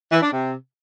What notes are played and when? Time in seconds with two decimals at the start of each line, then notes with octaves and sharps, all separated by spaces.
0.11 E3
0.22 D4
0.33 C3